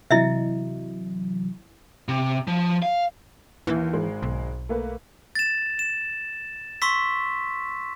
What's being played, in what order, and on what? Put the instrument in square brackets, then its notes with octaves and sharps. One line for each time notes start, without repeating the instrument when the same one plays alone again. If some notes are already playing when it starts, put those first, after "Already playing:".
[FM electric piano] C3 E3 F#3 [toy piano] E4 D#5 E5
[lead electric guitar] C3
F3
F5
[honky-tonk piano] D#2 [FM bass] E3
[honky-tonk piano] G#1 G#3
[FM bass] B1
[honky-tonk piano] A3 A#3 B4
[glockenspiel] A6 E7
E7
C6 C#6 E6 B6